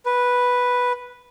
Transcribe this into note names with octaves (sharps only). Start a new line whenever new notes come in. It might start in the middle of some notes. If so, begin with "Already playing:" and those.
B4